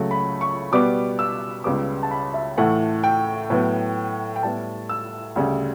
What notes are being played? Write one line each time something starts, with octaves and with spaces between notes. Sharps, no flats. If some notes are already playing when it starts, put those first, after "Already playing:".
Already playing: C#2 C#3 F#3 A3
B5
C#6
B2 G3 B3 D6
E6
C#2 C#3 G3 B3 D6
A5
B5
E5
A2 E3 A3 F#5
G5
A2 F#3 B3
G5
A2 G3 B3 A5
E6
D2 C#3 G3